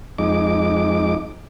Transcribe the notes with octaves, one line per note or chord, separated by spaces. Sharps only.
F2 G#3 D#4 D6